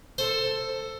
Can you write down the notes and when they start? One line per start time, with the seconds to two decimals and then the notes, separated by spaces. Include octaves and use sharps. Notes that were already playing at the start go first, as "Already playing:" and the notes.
0.18 A4 C5